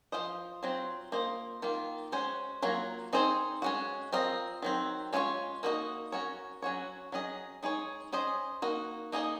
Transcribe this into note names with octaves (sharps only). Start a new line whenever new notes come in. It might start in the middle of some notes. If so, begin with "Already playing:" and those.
F3 C4 F4 C5 D#5
F#3 C4 F4 C5
A#3 F4 C5 D#5
D#3 A#3 F4
G#3 C#4 F#4 C5
F#3 A#3 F4 A#4 C#5
C4 D#4 G#4 C5 D#5
G#3 C#4 F#4
C4 F4 A#4 D#5
D#3 F#3 C4
G#3 C#4 F4 A#4 C#5
A#3 D#4 F#4 C5 D#5
C#4 F#4 A#4 C#5
F#3 C#4 F#4 C#5
F#3 C#4 G#4 D#5
G#3 D#4 G#4 C#5
C#4 G#4 C5 D#5
A#3 D#4 F#4
A#3 D#4 G#4 D#5